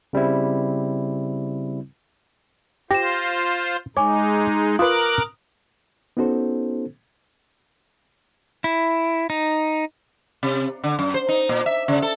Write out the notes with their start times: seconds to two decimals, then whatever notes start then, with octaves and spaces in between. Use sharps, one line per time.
0.13 C#3 G3 C4 E4
2.91 F4 G4 C5 A#6 E7
3.97 G#3 D#4 C#5 G#5 D6
4.79 F4 A#4 B4 D6 D#6 F#6
6.17 B3 C#4 D#4 F#4 A4 C5
8.64 E4
9.30 D#4
10.43 C3
10.84 D3
10.99 F#2
11.14 C5
11.29 D#4
11.49 A#2
11.66 E5
11.88 C#3
12.02 A4